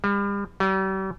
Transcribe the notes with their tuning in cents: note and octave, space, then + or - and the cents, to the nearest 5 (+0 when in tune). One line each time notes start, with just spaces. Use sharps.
G3 +40
G3 -40